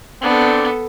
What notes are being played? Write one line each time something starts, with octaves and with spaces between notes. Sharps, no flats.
B3 C4 D4 A4